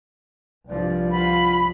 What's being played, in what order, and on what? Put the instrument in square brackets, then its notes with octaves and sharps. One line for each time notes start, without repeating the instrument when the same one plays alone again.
[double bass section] C2 G2 F3 [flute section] D5
[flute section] F4 F#5 B5